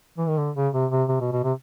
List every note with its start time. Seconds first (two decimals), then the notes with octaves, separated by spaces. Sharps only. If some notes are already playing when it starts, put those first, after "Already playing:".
0.18 E3
0.28 D#3
0.38 D3
0.56 C#3
0.73 C3
0.91 C3
1.09 C3
1.20 B2
1.32 B2
1.44 C3